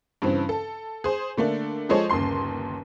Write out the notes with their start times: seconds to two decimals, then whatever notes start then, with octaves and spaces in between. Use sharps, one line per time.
0.22 G2 C#3 E3 C4
0.49 A4
1.04 G#4 C5
1.37 D3 A3 A#3 D4
1.89 F3 G#3 G#4 A4 C5 C#5
2.10 G1 D#2 C#3 C6 C7